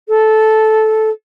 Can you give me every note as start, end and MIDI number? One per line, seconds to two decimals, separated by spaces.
0.08 1.09 69